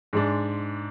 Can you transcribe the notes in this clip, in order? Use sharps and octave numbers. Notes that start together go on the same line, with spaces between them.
G#2 G#3 D4